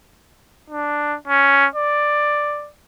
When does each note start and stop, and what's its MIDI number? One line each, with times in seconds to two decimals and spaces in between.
0.70 1.16 62
1.28 1.67 61
1.75 2.70 74